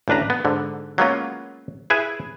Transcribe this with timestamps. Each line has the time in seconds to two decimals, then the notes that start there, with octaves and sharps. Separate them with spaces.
0.08 A1 D2 D4 B4 A#5
0.30 B3
0.45 G#2 D3
0.98 F#3 G#3 A#3 B3 C#4 F4
1.90 E4 G#4 B4 E5 G#5